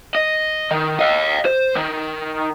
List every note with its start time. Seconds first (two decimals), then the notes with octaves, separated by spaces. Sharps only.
0.15 D#5
0.71 D#3
0.99 D#5 F5
1.46 C5
1.76 D#3